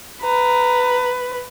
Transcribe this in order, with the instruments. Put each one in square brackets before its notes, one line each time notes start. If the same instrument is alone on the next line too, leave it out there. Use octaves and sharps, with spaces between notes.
[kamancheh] B4 [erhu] A#5